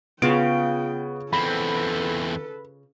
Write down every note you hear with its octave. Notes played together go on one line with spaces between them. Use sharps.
C#3 B3 F4 G5 D7
E2 C4 A4 B4 B5